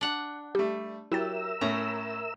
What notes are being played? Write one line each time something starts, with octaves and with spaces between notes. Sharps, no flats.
D4 F#5
G3 A3 G4
F#3 E4 G4 A#4 E5 E6 A6
A2 A3 C#4 A#5